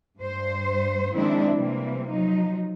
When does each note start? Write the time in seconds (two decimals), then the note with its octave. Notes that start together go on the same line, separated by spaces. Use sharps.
0.17 G2 C5
1.14 D#3 F3 G#3 C4 D4 E4
1.55 C3 E3 G3 A#3 C4
2.09 F3 F#3 D#4